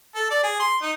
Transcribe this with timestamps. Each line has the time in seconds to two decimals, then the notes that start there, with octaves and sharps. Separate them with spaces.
0.15 A4
0.31 D5
0.43 G#4
0.60 C6
0.82 D#4